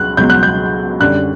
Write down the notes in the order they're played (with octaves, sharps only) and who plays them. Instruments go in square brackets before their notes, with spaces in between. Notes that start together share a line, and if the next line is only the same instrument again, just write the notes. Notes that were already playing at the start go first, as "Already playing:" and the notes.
Already playing: [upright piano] C#2 F#3 F#6
C#2 B2 F#3 G6
F#6
G6
F#2 D3 G3 F#6